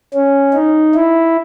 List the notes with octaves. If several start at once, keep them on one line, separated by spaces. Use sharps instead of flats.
C#4
D#4
E4